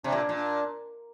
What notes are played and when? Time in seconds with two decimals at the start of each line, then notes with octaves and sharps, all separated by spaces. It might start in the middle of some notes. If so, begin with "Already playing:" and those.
0.04 C3 D4
0.12 A#2
0.29 A#2
0.36 D4